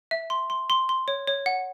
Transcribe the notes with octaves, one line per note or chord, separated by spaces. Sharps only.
E5
C6
C6
C6
C6
C#5
C#5
F#5